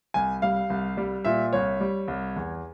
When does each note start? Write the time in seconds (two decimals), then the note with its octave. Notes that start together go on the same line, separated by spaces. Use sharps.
0.14 C2 G#5
0.42 G3 F5
0.70 C2
0.97 G3
1.24 A#2 E5
1.53 C2 C#5
1.81 G3
2.08 C2
2.36 E2